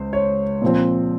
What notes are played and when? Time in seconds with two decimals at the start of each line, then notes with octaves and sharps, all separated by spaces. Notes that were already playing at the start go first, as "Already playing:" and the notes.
Already playing: C#2 C5
0.13 C#5
0.62 A#2 F3 C4